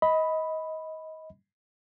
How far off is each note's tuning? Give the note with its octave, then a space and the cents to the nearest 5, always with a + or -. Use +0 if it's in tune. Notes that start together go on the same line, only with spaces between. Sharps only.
D#5 +25 B5 +0